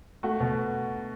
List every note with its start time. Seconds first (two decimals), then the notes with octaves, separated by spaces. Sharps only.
0.23 A3 F#4
0.40 B2